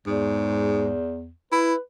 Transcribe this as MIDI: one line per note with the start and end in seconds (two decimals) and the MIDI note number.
0.07 1.31 40
0.07 0.95 44
1.52 1.74 64
1.52 1.79 71